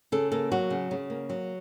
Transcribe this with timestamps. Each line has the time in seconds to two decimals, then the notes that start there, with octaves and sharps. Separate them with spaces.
0.12 C#3 A4
0.32 A#3 A4
0.52 F#3 F#4
0.70 C#3
0.91 C#3
1.10 A#3
1.30 F#3